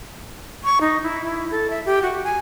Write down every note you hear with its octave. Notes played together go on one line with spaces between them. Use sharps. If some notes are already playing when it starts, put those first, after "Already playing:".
C#6
D#4
E4
E4
A4
E5
G4
F#4
G#5